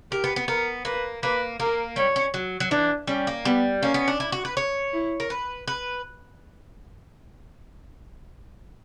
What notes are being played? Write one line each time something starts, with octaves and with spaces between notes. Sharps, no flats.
G4 A#4
B3
B3
B3 A#4
A#3 B4
A#3 B4
A#3 A#4
G3 C#5
C#4
F#3
F#3
E3 D4
G3 C#4
A#3
G3 B3
A#3 C#4
B3
D4
E4
F#4
B4
C#5
E4
A#4
B4
B4